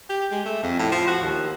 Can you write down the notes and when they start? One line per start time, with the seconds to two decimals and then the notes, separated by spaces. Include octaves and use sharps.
0.10 G4
0.32 G#3
0.46 A3
0.63 F2
0.79 A2
0.92 F3
1.08 F#4
1.22 D#2